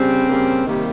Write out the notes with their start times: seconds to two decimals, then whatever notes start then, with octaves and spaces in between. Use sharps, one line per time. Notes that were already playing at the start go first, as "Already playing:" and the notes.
Already playing: C#3 G3 C4
0.27 C#3 G3 A#3
0.66 C3 D#3 G3 A#3